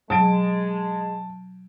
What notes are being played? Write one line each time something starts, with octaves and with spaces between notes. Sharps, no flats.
B2 F#3 G#3 A5 D7